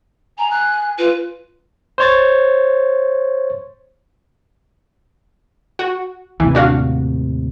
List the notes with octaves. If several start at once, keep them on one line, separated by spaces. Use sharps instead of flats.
G#5 A#5
F#6
F4 B4
C5 C#5 A6
F#4
D#2 A2 C3 E3
D4 F#4 F5